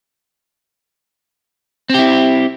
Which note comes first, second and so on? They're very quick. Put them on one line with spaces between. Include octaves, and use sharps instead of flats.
C4 G4 E4